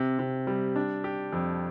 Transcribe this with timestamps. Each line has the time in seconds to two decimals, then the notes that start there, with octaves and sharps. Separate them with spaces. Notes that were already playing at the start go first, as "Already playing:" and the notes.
Already playing: C3
0.19 C3
0.47 G3
0.76 D4
1.04 G4
1.32 F2